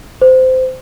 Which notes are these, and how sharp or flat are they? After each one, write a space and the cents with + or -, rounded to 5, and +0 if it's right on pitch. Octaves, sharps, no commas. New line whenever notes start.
C5 -20